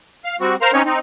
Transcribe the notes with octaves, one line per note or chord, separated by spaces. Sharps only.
F5
G3 C4 F#4
A#4 C5 F5 A#5
C4 C#4 D#4 C#5
C4 D#4